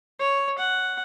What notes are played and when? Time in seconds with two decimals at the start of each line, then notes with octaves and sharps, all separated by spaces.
0.20 C#5
0.59 F#5